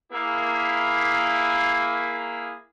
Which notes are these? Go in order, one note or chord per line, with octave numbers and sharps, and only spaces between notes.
A#3 E4 G#4